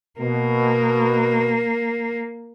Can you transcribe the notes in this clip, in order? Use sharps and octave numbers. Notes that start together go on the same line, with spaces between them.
B2 A#3